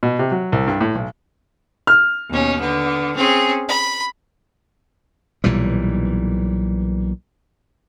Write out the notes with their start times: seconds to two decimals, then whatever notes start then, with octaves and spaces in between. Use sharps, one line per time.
0.03 B2
0.19 C3
0.31 F#3
0.52 C2
0.67 G2
0.81 A2
0.95 B1
1.87 F6
2.29 D#2 B2 C#4
2.58 D3 B3
3.15 C4 C#4 G#4
3.68 B5
5.44 B1 A#2 E3 G3